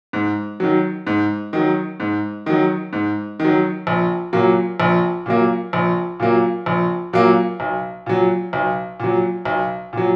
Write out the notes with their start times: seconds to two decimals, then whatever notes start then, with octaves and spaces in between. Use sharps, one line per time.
0.13 G#2
0.60 D#3 F#3
1.07 G#2
1.53 D#3 F#3
2.00 G#2
2.46 D#3 F#3
2.93 G#2
3.40 D#3 F#3
3.87 A#1
4.33 A#2 F#3 A#3
4.80 A#1
5.26 A#2 F#3 A#3
5.73 A#1
6.20 A#2 F#3 A#3
6.66 A#1
7.13 A#2 F#3 A#3
7.60 B1
8.06 A#2 F#3
8.53 B1
9.00 A#2 F#3
9.45 B1
9.93 A#2 F#3